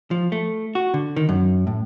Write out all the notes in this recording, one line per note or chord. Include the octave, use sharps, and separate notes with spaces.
F3
A3
F#4
D3
D#3
F#2
A2